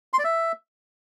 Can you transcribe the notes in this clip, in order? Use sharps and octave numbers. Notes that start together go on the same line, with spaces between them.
C6
D5
E5